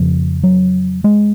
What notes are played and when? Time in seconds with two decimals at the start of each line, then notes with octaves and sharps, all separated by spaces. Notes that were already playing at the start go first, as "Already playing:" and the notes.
Already playing: F2 C#3 F3
0.43 F#3
1.04 G#3